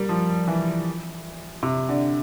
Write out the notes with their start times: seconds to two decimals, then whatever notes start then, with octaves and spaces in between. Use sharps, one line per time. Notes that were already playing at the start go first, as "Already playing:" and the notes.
Already playing: G3 A#3
0.09 F3
0.47 E3
1.63 C3
1.89 D3